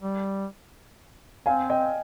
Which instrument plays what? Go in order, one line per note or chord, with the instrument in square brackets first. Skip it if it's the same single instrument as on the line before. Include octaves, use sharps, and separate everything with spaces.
[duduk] G3
[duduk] C4 [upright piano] F5 G#5
[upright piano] D#5 G5